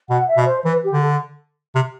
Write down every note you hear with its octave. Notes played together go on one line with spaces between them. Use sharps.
B2 F#5
E5
B2
C5
E3 B4
G4
D3
A4
C3